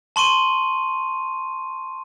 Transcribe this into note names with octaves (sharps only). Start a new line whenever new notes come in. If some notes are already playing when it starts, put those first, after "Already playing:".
A5 C6 C#6 D#7